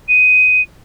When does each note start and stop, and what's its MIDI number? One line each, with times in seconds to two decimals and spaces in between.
0.09 0.62 99